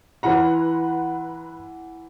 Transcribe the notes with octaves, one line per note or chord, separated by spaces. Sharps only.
E3 B4 F#5 A#5 C6